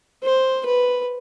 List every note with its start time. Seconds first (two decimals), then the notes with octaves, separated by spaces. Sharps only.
0.23 C5
0.66 B4